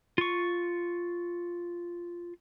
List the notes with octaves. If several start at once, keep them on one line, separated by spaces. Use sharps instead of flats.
F4 C#6